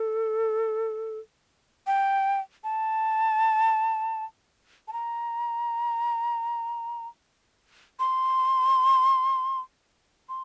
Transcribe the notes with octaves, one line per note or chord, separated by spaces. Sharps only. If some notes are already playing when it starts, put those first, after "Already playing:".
Already playing: A4
G5
A5
A5
A#5
C6
C6